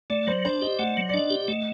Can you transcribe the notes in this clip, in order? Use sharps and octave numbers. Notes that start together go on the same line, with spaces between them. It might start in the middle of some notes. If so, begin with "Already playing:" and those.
A3 D5
F#3 C5
D4 C5
G4 D#5
A3 F#5
F#3
D5
D4 D#5
G4
A3 D#5